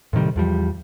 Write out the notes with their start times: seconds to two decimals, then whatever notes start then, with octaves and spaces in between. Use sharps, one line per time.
0.13 A2 C3 D#3 G3
0.36 E2 F3 G3